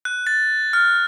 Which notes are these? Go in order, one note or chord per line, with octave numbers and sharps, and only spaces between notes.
F#6
A6
F6